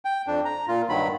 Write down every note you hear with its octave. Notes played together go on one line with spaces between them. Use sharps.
G5
F2 D4
A#5
A#2 F4
G2 D#3 F#3 B5